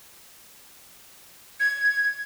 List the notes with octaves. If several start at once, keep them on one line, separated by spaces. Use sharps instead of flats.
G#6